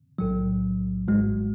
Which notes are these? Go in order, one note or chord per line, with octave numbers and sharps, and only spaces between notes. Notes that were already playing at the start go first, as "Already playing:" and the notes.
B1 A2 F#3
G#1 G#2 G#3